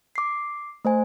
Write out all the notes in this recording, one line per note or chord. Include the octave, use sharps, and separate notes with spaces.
D6 C7
A3 C5 G#5